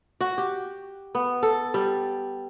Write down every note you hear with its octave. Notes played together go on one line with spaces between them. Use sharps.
F#4
G4
B3
A4
G3